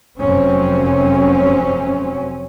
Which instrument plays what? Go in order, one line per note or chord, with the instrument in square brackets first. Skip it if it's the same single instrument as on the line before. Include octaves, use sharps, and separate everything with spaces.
[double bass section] F1 F#2 F#3 C4 C#4